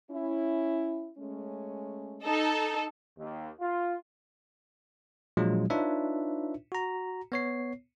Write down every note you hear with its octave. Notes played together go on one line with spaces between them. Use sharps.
C#4 E4
G#3 A3 C#4
D#4 A4
D#2
F4
A#2 F3 F#3 G#3 D4 F4
D4 D#4 F4 B4 C#5 E5
F#4 A#5
B3 C#5 C7